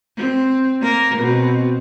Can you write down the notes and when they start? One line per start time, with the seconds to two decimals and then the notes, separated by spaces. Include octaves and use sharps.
0.17 C4
0.81 A#3 A#4
1.18 B2 C4